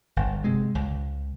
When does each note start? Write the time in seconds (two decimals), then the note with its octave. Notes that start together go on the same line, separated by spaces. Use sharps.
0.16 G1
0.44 C3 G#3
0.75 C#2